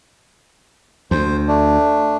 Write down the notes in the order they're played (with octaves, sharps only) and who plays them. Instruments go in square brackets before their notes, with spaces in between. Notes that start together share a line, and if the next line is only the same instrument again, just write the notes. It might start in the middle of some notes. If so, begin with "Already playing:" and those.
[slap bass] D2 [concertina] C5
[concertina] A3 D4